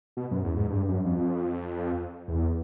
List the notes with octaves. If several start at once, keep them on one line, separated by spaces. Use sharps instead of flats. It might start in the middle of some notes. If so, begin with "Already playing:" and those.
B2
F#2
E2
G#2
G2
F#2
F2
E2